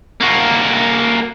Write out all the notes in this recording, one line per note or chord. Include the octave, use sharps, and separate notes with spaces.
A#3 F#4